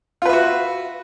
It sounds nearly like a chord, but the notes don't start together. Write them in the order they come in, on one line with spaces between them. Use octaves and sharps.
F4 B4 E5 F#4